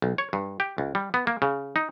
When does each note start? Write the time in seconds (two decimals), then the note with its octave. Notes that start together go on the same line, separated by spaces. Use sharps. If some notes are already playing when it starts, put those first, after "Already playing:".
0.02 B1
0.18 C#5
0.33 G2
0.60 G4
0.78 C#2
0.95 G3
1.14 B3
1.27 A#3
1.42 C#3
1.76 D#4